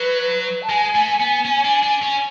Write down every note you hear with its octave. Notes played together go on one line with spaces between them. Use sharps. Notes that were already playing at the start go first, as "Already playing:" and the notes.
Already playing: F#3 B4
A5
G#3 G#5
A3
B3
C#4
D4
D4
C#4